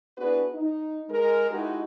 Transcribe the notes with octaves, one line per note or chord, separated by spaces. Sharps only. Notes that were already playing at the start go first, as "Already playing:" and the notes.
B3 D4 E4 F#4 G#4 B4
D#4
G#3 A#4
G#3 D#4 E4 F#4 G4